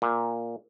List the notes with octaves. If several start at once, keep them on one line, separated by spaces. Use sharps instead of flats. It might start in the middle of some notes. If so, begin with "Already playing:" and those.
A#2